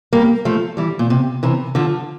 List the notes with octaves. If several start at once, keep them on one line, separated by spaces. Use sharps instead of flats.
G3 A#3
F3 A3
E3 G3
A#2
C3
C3 E3
D3 F3